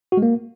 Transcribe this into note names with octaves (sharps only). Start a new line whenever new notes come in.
F#4
G#3
A#3